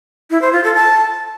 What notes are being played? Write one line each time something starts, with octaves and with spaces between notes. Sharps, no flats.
E4
C5
F4
A4
A5